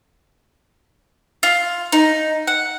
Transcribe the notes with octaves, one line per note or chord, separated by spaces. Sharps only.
F4
D#4
F#5